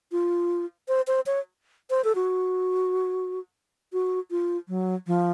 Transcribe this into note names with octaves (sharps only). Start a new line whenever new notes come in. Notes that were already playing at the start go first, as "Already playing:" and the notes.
F4
C5
C5
C#5
C5
A4
F#4
F#4
F4
F#3
F3